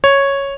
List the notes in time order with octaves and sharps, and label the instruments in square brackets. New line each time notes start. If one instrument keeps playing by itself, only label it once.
[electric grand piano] C#5